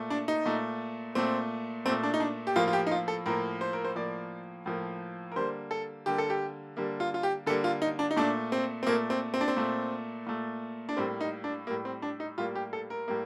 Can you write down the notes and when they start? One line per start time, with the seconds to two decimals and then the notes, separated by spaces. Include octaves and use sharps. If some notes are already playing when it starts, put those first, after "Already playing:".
Already playing: A#2 A3
0.10 D4
0.28 D#4
0.46 A#2 A3
1.15 A#2 A3 C4
1.85 A3 C4
1.89 A#2
2.03 D4
2.14 D#4
2.20 D4
2.47 G4
2.56 A2 F3 A#3 F4
2.68 F4
2.73 G4
2.87 D#4
2.91 F4
3.08 A4
3.26 A2 F3 A#3 A#4
3.61 C5
3.73 A#4
3.85 C5
3.95 A2 F3 A#3 D5
4.66 A2 F3 A#3
5.32 A#4
5.36 D3 G3 A#3 C5
5.71 A4
6.06 D3 G3 A#3 G4
6.18 A4
6.30 G4
6.77 D3 G3 A#3
7.00 F4
7.14 F4
7.23 G4
7.46 D3 G3 A#3 A4
7.64 F4
7.82 D#4
7.99 D4
8.11 D#4
8.17 A#2 A3 D4
8.52 C4
8.83 C4
8.87 A#2 A3 A#3
9.10 C4
9.34 C4
9.41 D4
9.48 C4
9.57 A#2 A3
10.27 A#2 A3
10.89 D4
10.97 A2 G3 A#3 C4
11.21 D#4
11.44 D4
11.67 A2 G3 A#3
11.85 C4
12.02 D4
12.20 D#4
12.38 A2 G3 A#3 F4
12.56 G4
12.73 A4
12.90 A#4
13.08 A2 G3 A#3